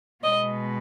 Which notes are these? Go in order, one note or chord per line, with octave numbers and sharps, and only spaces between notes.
B2 G#3 B3 D#5